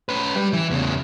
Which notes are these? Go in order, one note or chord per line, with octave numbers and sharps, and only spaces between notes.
C#4 B4
G3
E3
E2 C#3